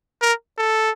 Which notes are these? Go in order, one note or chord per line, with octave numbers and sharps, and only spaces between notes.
A#4
A4